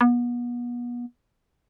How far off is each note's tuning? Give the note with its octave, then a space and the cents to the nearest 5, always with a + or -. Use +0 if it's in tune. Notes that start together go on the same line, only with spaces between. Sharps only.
B3 -35